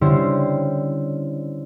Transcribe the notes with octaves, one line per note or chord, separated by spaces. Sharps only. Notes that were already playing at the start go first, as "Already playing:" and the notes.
D3 G3 C#4 E4 C5